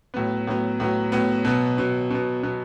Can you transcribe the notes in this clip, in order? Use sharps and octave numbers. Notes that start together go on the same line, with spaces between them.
A2 F#3 B3
A2 F#3 B3
A2 F#3 B3
A2 F#3 B3
B2 F#3 B3
B2 F#3 B3
B2 F#3 B3
B2 F#3 B3